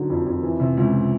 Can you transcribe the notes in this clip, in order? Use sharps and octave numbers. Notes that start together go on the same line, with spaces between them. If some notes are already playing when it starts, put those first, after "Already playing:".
Already playing: D3 D#3 F#3
F2
F2
E3
C3
C#2